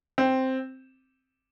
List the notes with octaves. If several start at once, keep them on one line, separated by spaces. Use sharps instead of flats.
C4